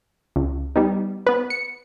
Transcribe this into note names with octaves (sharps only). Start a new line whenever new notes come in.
C#2
G3 B3 D#4
B3 B4
C#7